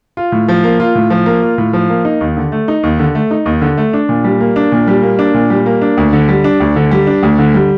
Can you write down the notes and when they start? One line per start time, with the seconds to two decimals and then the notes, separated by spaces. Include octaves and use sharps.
0.17 F4
0.32 A2
0.48 F3
0.64 A#3
0.80 F4
0.95 A2
1.10 F3
1.26 A#3
1.42 F4
1.58 A2
1.73 F3
1.89 A#3
2.05 D#4
2.21 D#2
2.37 D3
2.52 A3
2.68 D#4
2.83 D#2
2.99 D3
3.15 A3
3.31 D#4
3.46 D#2
3.62 D3
3.77 A3
3.93 D4
4.09 A#2
4.24 G3
4.40 A#3
4.56 D4
4.72 A#2
4.87 G3
5.03 A#3
5.19 D4
5.34 A#2
5.50 G3
5.66 A#3
5.82 D4
5.97 D2
6.13 D3
6.29 G3
6.44 D4
6.60 D2
6.76 D3
6.91 G3
7.07 D4
7.23 D2
7.39 D3
7.54 G3